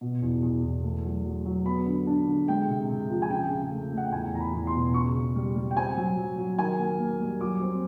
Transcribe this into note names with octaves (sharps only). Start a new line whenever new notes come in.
B2
E2
E2
E2
A3
F#3
F#3
F#3
B3 B5
D3
D4
D3
G#3 G5
C3
C3
F3
G#5
C#3 G5
C#3
A3
A3
F#5
G5
E2 G#5
E2 A#5
B5
E2
C6
B2
C#3 C#6
C#3
G3
G3
G5
C4 G#5
F#3
F#3
F#3
D#3 G#5
A#3
A#3
G3
F#3 D6
C4